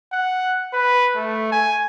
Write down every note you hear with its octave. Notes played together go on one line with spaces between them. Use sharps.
F#5
B4
A3
G#5